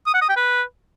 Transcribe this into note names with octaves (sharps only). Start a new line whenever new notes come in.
D#6
F#5
D#6
G5
B4